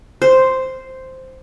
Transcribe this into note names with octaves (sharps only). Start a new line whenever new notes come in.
C5